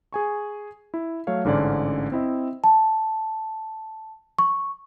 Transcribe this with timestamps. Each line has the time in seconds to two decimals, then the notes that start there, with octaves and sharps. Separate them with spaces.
0.13 G#4 G#5 C#6
0.94 E4
1.27 F#3 A3 C#5 F5
1.44 A1 G#2 D3 C#4 D5
2.12 C4 E4 D#5 E5
2.64 A5
4.39 C#6